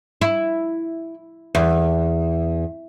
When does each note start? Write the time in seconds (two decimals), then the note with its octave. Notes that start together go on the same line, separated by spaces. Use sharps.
0.21 E4
1.55 E2